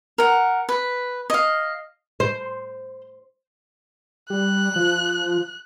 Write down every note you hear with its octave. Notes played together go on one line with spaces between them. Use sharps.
A#4 F#5
B4
D#5 F5
C5
G3 F#6
F3